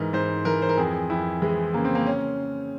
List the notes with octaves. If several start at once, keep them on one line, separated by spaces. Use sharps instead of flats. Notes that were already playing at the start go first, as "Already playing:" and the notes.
Already playing: G#2 E3 A#4
G#2 C5
E3 A#4
C5
A#4
F2 G#4
F2 E4
E3 G#3
C#3 A#3
C4
A#3
C#4